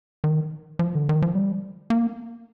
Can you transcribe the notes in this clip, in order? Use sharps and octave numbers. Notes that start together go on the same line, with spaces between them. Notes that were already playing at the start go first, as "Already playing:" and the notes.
D#3
F3
D3
D#3
F3
G3
A#3